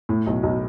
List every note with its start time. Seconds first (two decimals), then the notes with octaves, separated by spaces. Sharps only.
0.09 A2
0.26 B1
0.43 B1